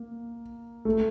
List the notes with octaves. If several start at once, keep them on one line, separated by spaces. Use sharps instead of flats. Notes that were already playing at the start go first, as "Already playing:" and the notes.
Already playing: A#3
A3